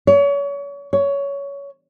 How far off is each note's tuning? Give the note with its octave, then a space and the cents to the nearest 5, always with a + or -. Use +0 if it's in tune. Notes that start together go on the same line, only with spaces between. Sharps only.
C#5 +35
C#5 +15